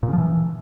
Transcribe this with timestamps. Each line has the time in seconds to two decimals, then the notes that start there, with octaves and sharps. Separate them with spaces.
0.03 A#2
0.08 C#3
0.13 F3
0.18 E3